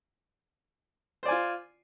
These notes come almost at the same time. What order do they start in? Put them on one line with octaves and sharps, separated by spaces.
C5 D5 G#5 F4